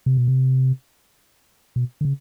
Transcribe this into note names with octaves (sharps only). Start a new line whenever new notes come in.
C3
B2
C3
B2
D3
C#3